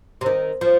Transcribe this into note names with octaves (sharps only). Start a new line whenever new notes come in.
C3
D#3
F3